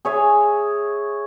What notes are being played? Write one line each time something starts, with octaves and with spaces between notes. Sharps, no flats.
G#4 C#5 E5